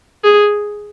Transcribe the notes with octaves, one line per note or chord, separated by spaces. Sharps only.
G#4